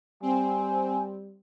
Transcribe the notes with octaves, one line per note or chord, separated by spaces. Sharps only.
G3 C4 G#5